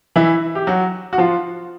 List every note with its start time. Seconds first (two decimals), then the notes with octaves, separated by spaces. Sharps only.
0.16 E3 E4
0.55 G4
0.67 F#3 F#4
1.13 F#4
1.18 F3 F4